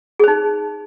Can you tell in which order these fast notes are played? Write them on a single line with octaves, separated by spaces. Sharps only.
G#4 C5 D#4